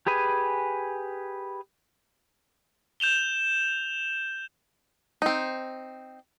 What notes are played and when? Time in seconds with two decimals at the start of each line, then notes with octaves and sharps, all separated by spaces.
0.07 G4 G#4 B4 G#5
3.00 G6 E7 F7 G7
5.22 C4 D#4